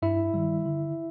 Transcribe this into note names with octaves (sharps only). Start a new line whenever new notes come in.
G2 E4 E5
D#3 G3
D3